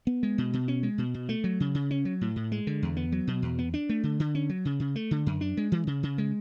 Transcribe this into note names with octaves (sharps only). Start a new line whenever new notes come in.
B3
G#3
B2
B2
C#4
G#3
B2
B2
A3
F#3
C#3
C#3
C#4
F#3
A2
A2
G#3
D3
E2
B3
F#3
B2
E2
B3
D4
A3
D3
D3
C#4
F#3
C#3
C#3
A3
D3
F#2
D4
G#3
E3
C#3
C#3
G#3